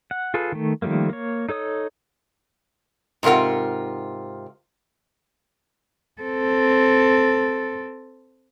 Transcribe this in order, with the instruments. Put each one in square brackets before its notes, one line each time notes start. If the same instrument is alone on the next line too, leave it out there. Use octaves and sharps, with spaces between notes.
[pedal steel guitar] F#5
F4 G#4 A4 B4
D#3 A3
D#3 F3 G3 A3 A#3
A#3 C#5
D#4 A4 C#5 D#6
[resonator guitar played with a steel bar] G#2 C3 F4 A#4 F#5
[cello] C4 A4